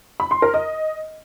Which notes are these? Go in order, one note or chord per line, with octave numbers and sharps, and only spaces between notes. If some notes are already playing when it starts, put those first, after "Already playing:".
B5
C6
A#4
D#5